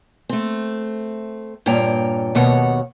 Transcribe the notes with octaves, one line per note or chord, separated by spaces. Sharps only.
A3 C4
G2 A#2 C#5 G5 A#5
D#2 B2 C#5 F#5